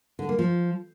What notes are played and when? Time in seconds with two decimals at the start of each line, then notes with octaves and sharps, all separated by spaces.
0.19 D3
0.29 A#3
0.39 F3